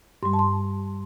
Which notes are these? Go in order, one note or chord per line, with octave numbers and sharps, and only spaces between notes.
G2 G3 C6
A5
C6